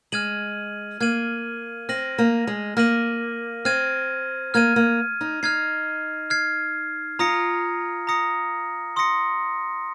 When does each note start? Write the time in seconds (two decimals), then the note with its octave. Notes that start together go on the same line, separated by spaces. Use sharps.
0.12 G#3 F6 G#6 D#7 F#7
1.00 A#3 F6 G#6 D#7 F#7
1.89 C4 F6 A#6 D#7 F#7
2.18 A#3
2.47 G#3
2.77 A#3 F6 A#6 D#7 F#7
3.65 C4 F6 G#6 D#7
4.54 A#3 F6 G#6 D#7
4.76 A#3
5.21 D#4
5.43 D#4 F6 G#6 C7
6.30 F6 G#6 C7
7.19 F4 A#5 D#6 A#6 C#7
8.07 A#5 D#6 A#6 C#7
8.96 C6 D#6 A#6 C#7